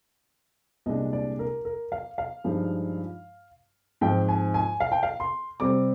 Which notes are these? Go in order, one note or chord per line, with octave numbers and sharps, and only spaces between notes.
C2 A#2 G#3 D4 D#5
D5
A#4
A#4
F5
F5
G2 F3 G#3 D#4
G#2 F3 C4 G5
G#5
G#5
F5
G5
F5
C6
C3 G3 C4 D6